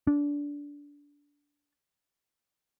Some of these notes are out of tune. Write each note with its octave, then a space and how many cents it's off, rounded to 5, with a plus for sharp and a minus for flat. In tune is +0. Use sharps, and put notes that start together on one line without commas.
D4 -20